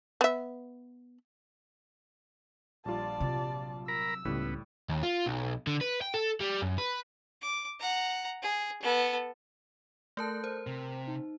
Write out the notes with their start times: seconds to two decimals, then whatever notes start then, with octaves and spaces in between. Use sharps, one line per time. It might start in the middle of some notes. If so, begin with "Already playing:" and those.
0.21 B3 E5
2.85 A#1 G3 F4 D5 A5
3.20 C3 F#3
3.88 A#4 A#5 B5 E6
4.25 C#2 A2 G3 B3
4.89 D#2
5.03 F4
5.26 B1
5.67 D3
5.81 B4
6.01 G5
6.14 A4
6.40 G3
6.62 F#2
6.78 B4
7.42 D6
7.79 F#5 A#5
8.42 G#4
8.82 B3 A4
10.17 A3 A4 A#4 A5 F#6 G6
10.44 A#4 C5
10.67 C3
11.08 D#4